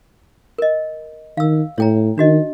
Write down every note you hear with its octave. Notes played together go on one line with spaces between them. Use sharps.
A#4 D#5
D#3 F5 E6
A2 C#5 G5 A#5
D#3 D4 F#4 D#5